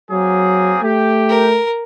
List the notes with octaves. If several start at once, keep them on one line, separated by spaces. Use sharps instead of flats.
F#3 A#3 C4 G#4
A3 G4
A#4